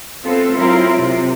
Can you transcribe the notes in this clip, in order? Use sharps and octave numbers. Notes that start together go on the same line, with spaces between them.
A3 B3 C4 F4 A4
F#3 C4 E4 F4 A#4
C3